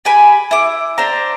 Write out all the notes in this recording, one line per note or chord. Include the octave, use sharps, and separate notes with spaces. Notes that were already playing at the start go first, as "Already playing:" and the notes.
G4 G#5 B5
E4 D6
D4 C5 A#5